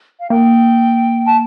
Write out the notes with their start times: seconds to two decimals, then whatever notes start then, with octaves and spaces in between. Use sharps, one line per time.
0.20 F5
0.30 A#3 G5
1.25 A5